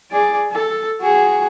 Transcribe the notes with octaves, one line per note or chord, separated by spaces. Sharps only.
G#4 D5
A4
F#4 G#4